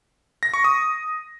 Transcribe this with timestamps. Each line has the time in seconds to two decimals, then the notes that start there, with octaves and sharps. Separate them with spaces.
0.43 A#6
0.54 C#6
0.64 D#6